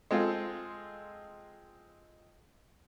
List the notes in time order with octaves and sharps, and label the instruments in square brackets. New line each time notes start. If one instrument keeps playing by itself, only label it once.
[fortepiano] G#3 C4 F4 A4 F5